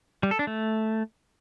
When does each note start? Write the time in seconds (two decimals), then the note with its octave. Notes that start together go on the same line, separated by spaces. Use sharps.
0.23 G3
0.31 A4
0.39 D4
0.47 A3